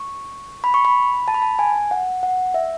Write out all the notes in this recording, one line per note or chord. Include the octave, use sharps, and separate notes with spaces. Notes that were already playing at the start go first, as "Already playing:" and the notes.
Already playing: C#6
B5
C#6
B5
A5
B5
A5
G#5
F#5
F#5
E5